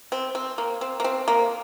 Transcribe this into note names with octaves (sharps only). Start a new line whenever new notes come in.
C4
C4
A#3
C4
A#3
C4
A#3